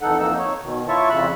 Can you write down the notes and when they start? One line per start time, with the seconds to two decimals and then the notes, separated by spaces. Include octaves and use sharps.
0.01 F2 E3 D#4 A4 F#5
0.20 F2 A#3 D#4 E6
0.38 C#5
0.63 B2 D#3
0.88 E4 F4 C#5 E5 A5 C#6
1.10 F2 C#3 B5 E6 F#6